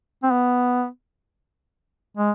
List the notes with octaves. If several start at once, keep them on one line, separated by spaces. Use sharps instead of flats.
C4
B3
G#3